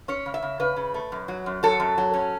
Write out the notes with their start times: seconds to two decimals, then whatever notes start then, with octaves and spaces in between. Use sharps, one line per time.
0.08 C#4 C#5
0.26 C#3
0.34 E5
0.42 C#3
0.60 C#3 B4
0.76 C#3
0.94 A3
1.12 F#2
1.28 F#3
1.46 F#2
1.63 F#3 A4
1.80 F#2
1.98 F#3
2.14 C#4